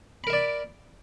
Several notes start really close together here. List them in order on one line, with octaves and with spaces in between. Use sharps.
B5 A#4 E5 D5